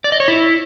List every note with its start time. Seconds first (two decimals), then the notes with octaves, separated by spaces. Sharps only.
0.04 D5
0.12 D#5
0.20 C#5
0.28 E4